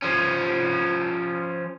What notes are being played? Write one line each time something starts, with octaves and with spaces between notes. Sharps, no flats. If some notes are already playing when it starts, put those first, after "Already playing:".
F3 C#4